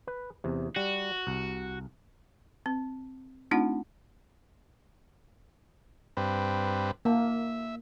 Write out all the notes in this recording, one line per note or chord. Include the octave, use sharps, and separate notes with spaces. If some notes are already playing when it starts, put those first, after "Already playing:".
B4
E2 C3
G3 F#4
C2
C4
A3 C4 D4 D#4 F4 F#5
G2 C4 B4
A#3 E5